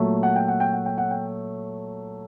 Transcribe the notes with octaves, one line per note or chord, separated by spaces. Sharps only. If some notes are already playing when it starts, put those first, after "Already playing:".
Already playing: A#2 F#3 A3
F#5
G5
F#5
G5
F#5
G5
F#5
G5